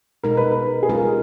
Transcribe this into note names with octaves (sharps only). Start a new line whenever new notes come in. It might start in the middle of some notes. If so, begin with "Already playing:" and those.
B2 G#3 D#4 A#4
B4
A#4
G#4
G#3 C#4 F4 A#4